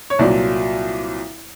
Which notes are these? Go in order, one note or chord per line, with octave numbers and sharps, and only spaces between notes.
C#5
C2 A#2 F#3 D5